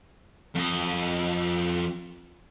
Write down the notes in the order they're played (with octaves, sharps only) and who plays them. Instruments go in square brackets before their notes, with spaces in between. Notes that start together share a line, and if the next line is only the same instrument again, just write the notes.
[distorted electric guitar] F2 D#5